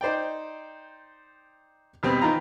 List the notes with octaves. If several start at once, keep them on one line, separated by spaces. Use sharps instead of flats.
D#4 C5 D5 G5
D#2 B2 G3 C4
D#3 E3 F4 A#5